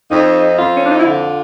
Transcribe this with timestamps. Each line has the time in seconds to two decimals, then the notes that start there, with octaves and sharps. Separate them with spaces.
0.11 F2 D#4
0.59 F2 F4
0.77 C#4
0.84 D4
0.91 D#4
0.99 E4
1.06 D3 F4